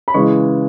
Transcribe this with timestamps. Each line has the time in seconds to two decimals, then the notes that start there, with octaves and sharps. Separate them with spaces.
0.08 B5
0.14 C#3 E3 G#3 C#6